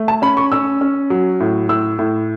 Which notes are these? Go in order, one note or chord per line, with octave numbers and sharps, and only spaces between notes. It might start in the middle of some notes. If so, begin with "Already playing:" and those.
Already playing: A3
A5
C#4 B5
C#6
C#4 E6
C#4
F#3
A2
A2 E6
A2